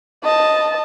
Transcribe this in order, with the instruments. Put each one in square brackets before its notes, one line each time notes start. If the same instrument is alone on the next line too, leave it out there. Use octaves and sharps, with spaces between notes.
[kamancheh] D#5 A5